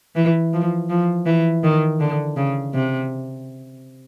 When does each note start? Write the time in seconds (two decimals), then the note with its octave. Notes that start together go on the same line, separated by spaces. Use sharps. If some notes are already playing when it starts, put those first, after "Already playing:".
0.16 E3
0.53 F3
0.90 F3
1.26 E3
1.63 D#3
2.00 D3
2.37 C#3
2.74 C3